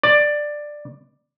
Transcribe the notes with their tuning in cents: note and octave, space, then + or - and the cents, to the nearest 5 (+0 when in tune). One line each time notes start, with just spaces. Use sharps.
D5 +10